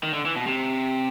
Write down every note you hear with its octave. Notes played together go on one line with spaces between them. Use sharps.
D#3
D3
E3
B2
C3